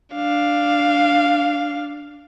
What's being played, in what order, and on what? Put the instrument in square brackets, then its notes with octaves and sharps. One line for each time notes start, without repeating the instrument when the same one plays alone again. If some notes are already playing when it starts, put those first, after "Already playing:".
[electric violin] D4 F5